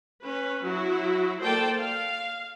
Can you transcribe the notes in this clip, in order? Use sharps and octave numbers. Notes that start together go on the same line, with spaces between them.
C#4 B4
F#3 E4 F#4
A#3 A4 C5 D5 G5 A5
F5